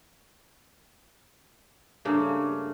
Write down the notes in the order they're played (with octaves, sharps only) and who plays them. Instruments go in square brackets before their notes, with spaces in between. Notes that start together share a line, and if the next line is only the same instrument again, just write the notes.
[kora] G2 C#3 A3 A#3